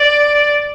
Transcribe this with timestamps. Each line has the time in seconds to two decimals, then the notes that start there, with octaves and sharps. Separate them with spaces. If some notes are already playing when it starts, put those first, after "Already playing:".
Already playing: D5